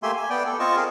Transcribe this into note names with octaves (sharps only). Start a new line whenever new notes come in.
A3 A#3 G4 E5 G#5 C6
G#5
B3 D5 G5
A4
C4 F4 D#5 A5 C#6
G#4 A#4